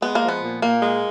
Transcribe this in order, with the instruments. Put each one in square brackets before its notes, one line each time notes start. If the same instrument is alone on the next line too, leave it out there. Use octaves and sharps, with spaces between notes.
[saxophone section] G#3 [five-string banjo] B3
[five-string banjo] A#3
[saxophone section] F3
[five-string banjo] B3
[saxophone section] A#2
[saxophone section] A#2 [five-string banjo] A#3
[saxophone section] G#3